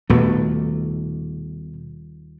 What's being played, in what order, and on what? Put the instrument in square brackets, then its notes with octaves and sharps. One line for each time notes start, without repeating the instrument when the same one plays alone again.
[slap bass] D#1 D#2 A3 [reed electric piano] B2